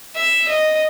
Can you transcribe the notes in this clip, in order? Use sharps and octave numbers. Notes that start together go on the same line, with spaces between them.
E5
D#5